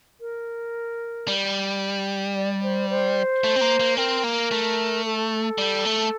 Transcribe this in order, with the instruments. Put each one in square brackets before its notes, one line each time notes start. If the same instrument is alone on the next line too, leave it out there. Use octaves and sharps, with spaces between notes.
[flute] A#4
[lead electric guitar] G3
[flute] D5
C5
C5
[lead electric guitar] A3
C4
A#3
A#3
[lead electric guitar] C4 [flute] A#4
[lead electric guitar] A#3
A3
[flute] A4
[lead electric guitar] G3
A3